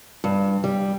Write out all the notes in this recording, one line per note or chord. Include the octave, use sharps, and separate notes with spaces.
G2
G3